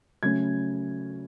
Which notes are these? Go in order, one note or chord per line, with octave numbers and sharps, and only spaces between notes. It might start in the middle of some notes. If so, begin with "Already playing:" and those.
C#3 F#3 A3 C#4 G#6